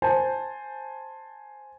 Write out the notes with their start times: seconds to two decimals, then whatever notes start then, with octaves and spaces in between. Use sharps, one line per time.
0.02 C5 G#5 A5